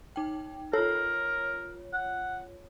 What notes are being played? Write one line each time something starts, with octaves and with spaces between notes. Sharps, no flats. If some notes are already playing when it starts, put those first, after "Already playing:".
D#4 G5
F4 A4 A#4 C#5
F#5